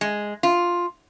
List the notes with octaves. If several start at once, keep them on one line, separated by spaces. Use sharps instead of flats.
G#3
F4